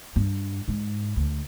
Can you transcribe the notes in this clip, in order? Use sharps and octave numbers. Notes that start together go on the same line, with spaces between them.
G2
G#2
D2